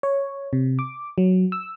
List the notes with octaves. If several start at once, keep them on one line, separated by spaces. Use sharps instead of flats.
C#5
C3
D6
F#3
E6